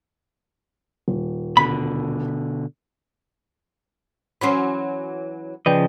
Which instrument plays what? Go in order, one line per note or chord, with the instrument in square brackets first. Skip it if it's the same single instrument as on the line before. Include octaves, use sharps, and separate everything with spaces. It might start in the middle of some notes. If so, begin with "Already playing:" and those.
[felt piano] D#1
[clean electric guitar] B2 D3 [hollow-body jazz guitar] B5
[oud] E3 F#3 C#4 [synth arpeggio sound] B5 C6
[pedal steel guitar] C#3 F3 D#5 [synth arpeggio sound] B4 D5 G5